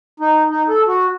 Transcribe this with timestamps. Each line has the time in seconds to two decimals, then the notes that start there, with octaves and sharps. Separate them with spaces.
0.20 D#4
0.50 D#4
0.68 A4
0.87 F#4